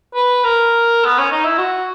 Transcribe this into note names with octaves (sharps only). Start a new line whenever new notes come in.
B4
A#4
B3
C#4
D#4
E4
F#4